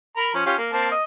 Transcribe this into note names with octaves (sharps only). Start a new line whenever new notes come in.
A#4 A#5 B5
F3 C#4
C#4 F4 G4
A#3
A#3 C4 A5
D#5